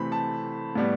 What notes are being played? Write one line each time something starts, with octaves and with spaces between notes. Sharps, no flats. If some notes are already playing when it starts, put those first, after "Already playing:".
Already playing: C3 E3 A3 C4 B5
A5
A2 G3 B3